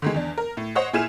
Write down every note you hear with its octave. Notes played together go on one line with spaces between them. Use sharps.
D3 D#3 G#3
E2 D4
A#4
A2
C5 C#5 D#5 F#5
A#2 E4 G#4 G#5 F6 E7